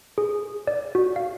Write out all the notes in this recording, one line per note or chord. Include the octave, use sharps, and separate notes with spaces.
G#4
D5
F#4
F5